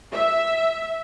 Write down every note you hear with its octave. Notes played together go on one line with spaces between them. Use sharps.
E5